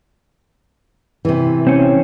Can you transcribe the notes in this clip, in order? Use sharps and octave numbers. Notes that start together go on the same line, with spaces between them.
C3 E3
C4 C#4